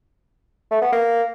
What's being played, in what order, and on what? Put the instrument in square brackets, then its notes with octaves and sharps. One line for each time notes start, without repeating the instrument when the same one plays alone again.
[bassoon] A3
B3
A#3